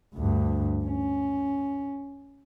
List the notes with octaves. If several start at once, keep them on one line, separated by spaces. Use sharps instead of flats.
D2 G2
C#4